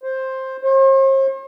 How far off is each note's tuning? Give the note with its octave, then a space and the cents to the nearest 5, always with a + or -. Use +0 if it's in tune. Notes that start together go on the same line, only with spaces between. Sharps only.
C5 +10
C5 +45